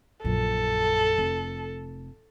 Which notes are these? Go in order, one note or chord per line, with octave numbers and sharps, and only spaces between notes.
A#1 F#2 A4
F1